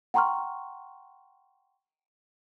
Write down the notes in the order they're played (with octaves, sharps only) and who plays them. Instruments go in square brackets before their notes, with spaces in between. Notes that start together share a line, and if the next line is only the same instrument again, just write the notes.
[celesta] F#5 G5 A#5 C6 C#6 F6